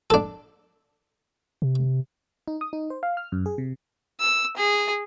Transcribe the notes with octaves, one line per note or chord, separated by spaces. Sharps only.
D4 A4
C3
D#4
D#6
D#4
C5
F5
F6
F#2
G#4
C3
E6
G#4